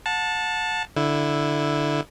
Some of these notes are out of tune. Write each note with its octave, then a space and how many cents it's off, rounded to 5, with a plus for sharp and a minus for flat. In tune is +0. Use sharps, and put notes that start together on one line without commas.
F#5 -35 A5 +0
D3 +0 E4 +0